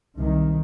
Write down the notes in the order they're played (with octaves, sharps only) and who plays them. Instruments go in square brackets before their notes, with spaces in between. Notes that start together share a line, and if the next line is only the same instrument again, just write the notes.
[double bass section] C2 C3 D#3